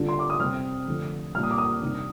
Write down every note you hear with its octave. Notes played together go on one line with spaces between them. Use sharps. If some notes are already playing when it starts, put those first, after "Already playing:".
Already playing: D3 G3 D4 F4
C6
D6
D#6
C3 G3 C4 F6
D3 F3 A3
A#2 G3 D4 F6
D#6
D6
D#6
C3 D#3 G3 D4